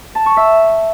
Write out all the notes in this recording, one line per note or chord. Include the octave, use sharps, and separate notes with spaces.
A5
C#6
E5